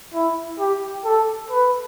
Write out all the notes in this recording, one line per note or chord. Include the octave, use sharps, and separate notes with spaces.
E4
G4
A4
B4